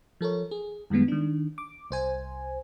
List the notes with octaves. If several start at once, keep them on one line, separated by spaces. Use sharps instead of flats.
F3 A4 A#4 C#5
G#4
F#2 D#3 G3 G#3 B3
D#3 D4
D6
C2 C5 G#5